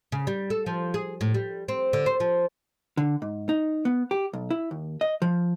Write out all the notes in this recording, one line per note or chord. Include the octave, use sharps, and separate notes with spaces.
C#3
G3
A4
F3
G#4
A2
G3
C4
D3
C5
F3
D3
G#2
D#4
B3
G4
B1
E4
D#2
D#5
F3